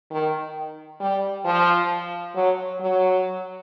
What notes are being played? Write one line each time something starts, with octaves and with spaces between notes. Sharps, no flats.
D#3
G3
F3
F#3
F#3